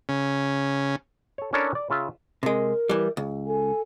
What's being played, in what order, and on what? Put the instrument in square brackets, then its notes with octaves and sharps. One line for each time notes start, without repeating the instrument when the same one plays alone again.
[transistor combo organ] C#3
[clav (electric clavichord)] A4 C#5
C#4 D4 E4 A4 A#4 C#5
D5
C#3 F4 E5
[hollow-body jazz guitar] C3 G#3 [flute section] A#4
[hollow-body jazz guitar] E3 G3
C#2
[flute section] A4 G#5